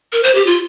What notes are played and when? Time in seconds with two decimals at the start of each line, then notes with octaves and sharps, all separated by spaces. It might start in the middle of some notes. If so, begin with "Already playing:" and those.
0.13 A#4
0.23 C5
0.35 G4
0.47 F4